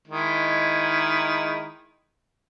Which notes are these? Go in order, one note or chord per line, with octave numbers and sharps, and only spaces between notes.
D#3 G#3 E4